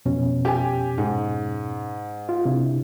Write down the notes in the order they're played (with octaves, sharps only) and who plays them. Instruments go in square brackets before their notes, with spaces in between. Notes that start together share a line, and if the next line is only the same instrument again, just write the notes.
[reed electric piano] F2 B2 C#4
[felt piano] G4 G#5
G#2
[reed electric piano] F4
C3 D4 E4